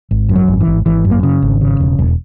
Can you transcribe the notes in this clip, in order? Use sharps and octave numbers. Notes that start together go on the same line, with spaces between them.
G#1
F#2
F#3
G#1
E3
G#1
G#1 E3
F#2
A#3
C#3
G#1
C#3
E1
E1